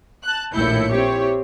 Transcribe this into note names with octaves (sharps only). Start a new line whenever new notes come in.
A5 F#6
A#1 D#2 A2 E4 G6 C#7
C4 E4 G4 C#5